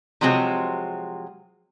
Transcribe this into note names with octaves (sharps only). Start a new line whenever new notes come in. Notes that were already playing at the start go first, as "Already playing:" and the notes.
C3 F3 F#3 G#3 C4